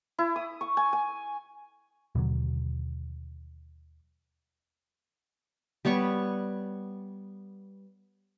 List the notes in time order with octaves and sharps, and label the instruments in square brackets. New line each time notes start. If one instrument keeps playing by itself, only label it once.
[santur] E4
D#6
C#6
G#5
G#5
[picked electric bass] D#2 B2 D3 F#3
[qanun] G3 B3 C#5 C#6